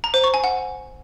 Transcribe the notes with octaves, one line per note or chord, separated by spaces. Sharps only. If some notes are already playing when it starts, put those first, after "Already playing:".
A#5
C5
C#6
G#5
F#5